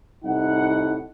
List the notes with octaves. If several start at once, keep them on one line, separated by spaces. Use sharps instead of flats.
C2 A2 D#4 F#5